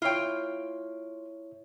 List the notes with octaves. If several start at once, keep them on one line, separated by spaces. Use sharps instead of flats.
E4 F4 C#5 G5